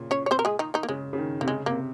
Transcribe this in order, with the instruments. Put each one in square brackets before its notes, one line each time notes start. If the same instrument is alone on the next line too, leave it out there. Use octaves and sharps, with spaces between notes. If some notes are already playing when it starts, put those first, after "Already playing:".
Already playing: [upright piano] A#2 C#3
[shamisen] C#4 C#5
C#5
C4 C5
A#4
G#3 G#4
D#3 D#4
D#3 D#4
A#3
[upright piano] C#3 [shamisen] G#3
[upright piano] C#3
D#3
[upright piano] C3 [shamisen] A#3
[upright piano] C#3 [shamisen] G#3
[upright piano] C3 [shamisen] A#3